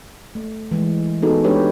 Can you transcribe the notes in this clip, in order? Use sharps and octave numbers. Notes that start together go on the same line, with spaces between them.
A3
E3 G#3
B3 D#4 F#4 G#4 A4
G#3 D4 G4 B4 C#5